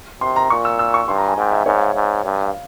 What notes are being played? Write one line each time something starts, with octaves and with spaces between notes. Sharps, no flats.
C3 C6
A#5
A#2 C#6
E6
E6
C#6
G2 C6
A#5
G#5
G#2 G5
E5
G#2 C#5
F5
E5
G#2
G2
F5